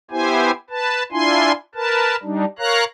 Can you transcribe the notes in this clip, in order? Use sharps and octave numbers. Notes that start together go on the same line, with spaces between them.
B3 E4 G4 C5 G#5
B4 A5
D4 E4 F4 G#5 C6
A#4 B4 A5
G3 D4 D#4
A#4 C#5 F5 A#5 F#6